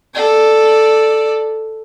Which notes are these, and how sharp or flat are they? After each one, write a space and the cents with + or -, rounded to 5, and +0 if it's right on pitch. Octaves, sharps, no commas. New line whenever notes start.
A4 +0 D5 +10